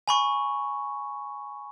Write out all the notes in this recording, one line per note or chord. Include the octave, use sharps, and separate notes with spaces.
G#5 B5 C#6